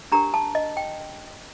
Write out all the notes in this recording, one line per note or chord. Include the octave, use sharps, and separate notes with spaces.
D4 G4 A#4 A#5
A5
D#5
G5